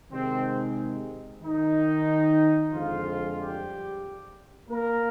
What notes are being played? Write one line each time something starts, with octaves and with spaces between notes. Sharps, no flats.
C3 D#3 G#3 C4
D#3 D#4
F2 D3 F3 G#3 F4
G3 G4
A#3 A#4